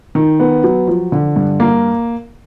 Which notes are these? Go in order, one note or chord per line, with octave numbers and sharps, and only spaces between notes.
D#3
B3
F#3
F3
D3
G2
A#3